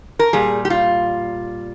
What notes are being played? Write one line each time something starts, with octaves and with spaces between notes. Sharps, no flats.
A#4
A#2 G3 G#4
G4
F4